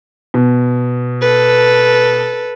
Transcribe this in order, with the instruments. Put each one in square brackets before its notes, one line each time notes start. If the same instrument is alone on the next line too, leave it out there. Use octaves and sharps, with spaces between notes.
[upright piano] B2
[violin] A4 B4